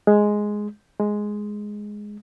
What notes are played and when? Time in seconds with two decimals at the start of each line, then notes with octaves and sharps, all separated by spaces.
0.07 G#3
1.00 G#3